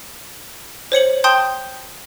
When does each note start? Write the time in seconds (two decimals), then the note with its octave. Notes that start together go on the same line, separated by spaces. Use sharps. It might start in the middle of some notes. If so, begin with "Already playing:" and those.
0.92 C5 C#5 C#7 F#7
1.24 G5 A5 C6 D#6 G6